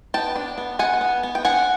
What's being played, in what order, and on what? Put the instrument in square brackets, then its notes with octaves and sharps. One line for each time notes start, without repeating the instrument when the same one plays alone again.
[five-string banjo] B3 G5 A5
D4
B3
B3 F#5 G#5
B3
B3
G5
D4 F#5 G#5